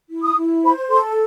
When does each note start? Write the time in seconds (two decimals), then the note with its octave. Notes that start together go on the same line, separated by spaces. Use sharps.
0.10 E4
0.23 D#6
0.36 E4
0.63 C5 B5
0.90 A4 C6